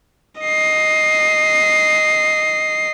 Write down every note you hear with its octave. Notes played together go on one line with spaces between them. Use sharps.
D#5 C7